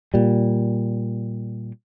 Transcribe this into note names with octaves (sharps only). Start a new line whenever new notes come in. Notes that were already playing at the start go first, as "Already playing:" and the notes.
A#2 G3